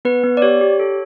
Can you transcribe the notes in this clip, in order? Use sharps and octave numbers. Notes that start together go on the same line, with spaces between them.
B3 B4
B3
D5
G4 C#5
G4
A4